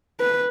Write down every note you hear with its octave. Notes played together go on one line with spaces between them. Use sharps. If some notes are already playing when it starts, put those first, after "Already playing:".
B4